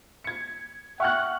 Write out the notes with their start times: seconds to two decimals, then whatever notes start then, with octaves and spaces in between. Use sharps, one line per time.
0.24 G#6 C#7
1.00 E5 F#5 G5 C#6 F6 F#6